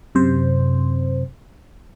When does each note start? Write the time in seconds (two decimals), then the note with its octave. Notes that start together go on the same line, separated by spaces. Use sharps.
0.15 F#2 C3 C5